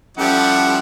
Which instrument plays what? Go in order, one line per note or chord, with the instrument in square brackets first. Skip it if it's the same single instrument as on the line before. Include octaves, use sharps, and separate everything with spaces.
[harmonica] F3 G3 E4 [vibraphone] C#4 [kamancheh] G4 A4 [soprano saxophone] F#5